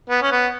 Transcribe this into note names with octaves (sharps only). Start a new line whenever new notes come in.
B3
C#4
B3